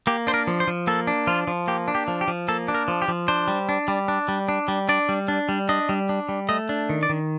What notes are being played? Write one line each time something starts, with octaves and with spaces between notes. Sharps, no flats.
A#3 G4
D4 C5
A#4
F3
C5
F3
A#3 A4
D4
F3 F4
F3
A#3 G4
D4
G4
F3
G4
F3
A#3 A4
D4
A#4
F3
G4
F3
D4 C5
G3
D4
G3
D4
G3
D4
G3
D4 D5
G3
D4
G3
D4 D#5
G3
D4
G3
A3 D#5
D4
D#3
D5
D#3